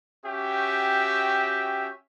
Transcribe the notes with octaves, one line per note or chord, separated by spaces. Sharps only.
C#4 F#4 G4 E5 G5